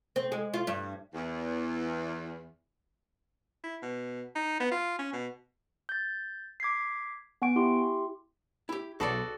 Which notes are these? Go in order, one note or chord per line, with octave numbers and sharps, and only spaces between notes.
C4
G#3
F4
G2
E2
E4
B2
D#4
B3
F4
C#4
B2
G6 A6
D6 G#6 B6 C7
B3 F#5 G#5 C#6 D7
E4 G4 C6
E4 G4
B1 F#4 G#4 A4 D5 A5 B5